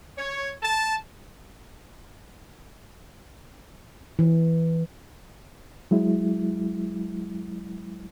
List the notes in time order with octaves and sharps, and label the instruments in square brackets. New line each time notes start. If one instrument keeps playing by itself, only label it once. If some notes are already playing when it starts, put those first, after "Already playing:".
[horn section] C#5
A5
[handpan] E3
[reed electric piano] F#3 G#3 E4